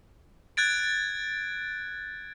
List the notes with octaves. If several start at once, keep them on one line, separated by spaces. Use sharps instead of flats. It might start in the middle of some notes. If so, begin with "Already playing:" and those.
F#6 G#6 A6 D7